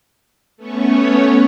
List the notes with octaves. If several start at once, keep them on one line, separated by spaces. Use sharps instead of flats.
A3 B3 C#4 C#5